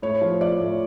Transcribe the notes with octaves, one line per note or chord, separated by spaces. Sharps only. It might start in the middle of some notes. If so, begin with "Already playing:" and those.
A2 C#5
F3
F3 D5
A2